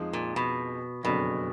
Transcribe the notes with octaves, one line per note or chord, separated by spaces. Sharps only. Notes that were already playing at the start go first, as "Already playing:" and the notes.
Already playing: F2 F3 G#3 D#4 G#4
A#2
B2
F#1 F2 B2 D3 F#3 D4